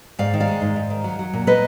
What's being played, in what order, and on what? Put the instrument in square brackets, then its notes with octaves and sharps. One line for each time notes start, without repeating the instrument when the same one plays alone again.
[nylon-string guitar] G#2 D5 F5
D#3
D5 F5
G#3
G#2
G#2
D#3
F#3
F#3
A#2
A#2 B4 D#5